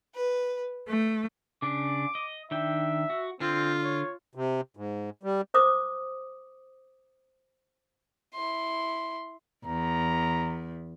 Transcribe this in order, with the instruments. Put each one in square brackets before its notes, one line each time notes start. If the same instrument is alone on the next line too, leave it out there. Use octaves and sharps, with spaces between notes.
[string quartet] B4
A3
[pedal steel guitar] C#3 D4 [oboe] D6
[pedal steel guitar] D#5
[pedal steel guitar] D#3 D4 G5 [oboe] E5
[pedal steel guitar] F#4
[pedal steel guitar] D3 [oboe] C4 [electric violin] F4
[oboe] C#5
[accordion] C3
G#2
G3
[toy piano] C5 D6 D#6
[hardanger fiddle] E4 C6
[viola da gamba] E2 [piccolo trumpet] A#5